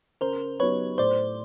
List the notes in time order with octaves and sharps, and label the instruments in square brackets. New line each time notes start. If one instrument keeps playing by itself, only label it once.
[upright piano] C#3 [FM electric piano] A#4 C5
[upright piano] F#3 B3 D#4 G4 [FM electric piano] B4 C#5
[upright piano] A2 [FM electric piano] C5 D5